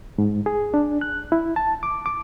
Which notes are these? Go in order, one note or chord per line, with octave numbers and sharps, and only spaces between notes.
G#2
G#4
D4
F#6
E4
A5
D6
D6